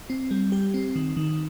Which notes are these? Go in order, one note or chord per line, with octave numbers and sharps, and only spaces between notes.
C4
G3
G4
C4
D#3
D#3